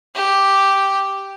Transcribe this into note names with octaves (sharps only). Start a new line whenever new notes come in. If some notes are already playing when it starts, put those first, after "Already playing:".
G4